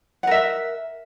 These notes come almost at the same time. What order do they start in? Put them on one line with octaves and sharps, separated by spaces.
F#5 A#4 E5